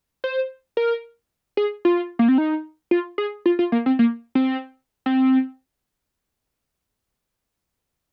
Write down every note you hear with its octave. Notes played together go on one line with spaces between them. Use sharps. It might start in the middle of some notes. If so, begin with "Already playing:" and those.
C5
A#4
G#4
F4
A#3
C4
D#4
F4
G#4
F4
F4
A#3
C4
A#3
C4
C4